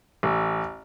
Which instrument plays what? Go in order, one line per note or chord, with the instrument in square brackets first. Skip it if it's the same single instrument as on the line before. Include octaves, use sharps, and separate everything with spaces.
[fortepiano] A1